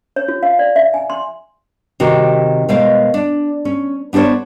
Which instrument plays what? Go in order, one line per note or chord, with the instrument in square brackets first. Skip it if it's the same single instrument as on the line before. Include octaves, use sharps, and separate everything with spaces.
[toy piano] C#5
F4
F5
D5
E5
G#5
C6
[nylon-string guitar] C3 D#3 F#4 A#4
B2 G#3 A#4 C5 F5
D4
C#4
B3 D4 F#4 C5 C#5